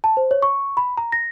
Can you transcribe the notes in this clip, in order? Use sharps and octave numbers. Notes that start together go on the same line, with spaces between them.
A5
C5
C#5
C#6
B5
A#5
A#6